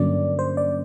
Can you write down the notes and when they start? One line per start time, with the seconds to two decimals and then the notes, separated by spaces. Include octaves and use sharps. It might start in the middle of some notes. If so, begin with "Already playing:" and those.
Already playing: G2 D3 F#3 A#3 C#4 D5
0.39 C5
0.57 D5